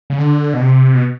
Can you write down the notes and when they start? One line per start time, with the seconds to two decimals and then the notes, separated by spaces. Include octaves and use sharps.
0.10 C#3
0.18 D3
0.54 B2
0.61 C3
0.95 B2